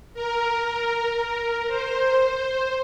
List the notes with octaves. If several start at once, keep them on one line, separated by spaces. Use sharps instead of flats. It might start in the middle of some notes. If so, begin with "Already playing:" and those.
A#4
A#4
A#4
C5
C5